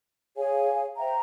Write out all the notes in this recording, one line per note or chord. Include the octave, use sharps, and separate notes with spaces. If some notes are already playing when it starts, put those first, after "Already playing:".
G#4 C#5 F5 G#5
C5 E5 G5 A#5